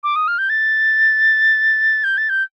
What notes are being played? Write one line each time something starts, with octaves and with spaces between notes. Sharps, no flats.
D6
D#6
F6
G6
A6
G6
A6
G6